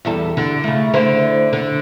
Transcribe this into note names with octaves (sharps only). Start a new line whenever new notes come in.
E2 G3 A4
D3
C#3 A3
D3 E4 C5
D3